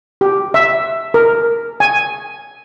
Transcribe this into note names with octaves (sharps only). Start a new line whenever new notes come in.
G4
E5
A#4
G#5